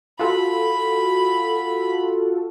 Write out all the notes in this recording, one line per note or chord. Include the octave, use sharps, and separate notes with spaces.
F4 F#4 A4 B5